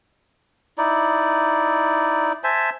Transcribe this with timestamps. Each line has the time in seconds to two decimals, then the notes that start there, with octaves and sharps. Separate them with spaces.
0.78 D#4 E4 D5
2.44 C5 E5 G#5 A5